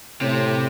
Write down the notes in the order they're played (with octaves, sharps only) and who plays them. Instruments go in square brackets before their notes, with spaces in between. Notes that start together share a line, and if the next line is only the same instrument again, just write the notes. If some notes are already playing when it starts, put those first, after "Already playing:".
[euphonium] A2 [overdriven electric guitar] C3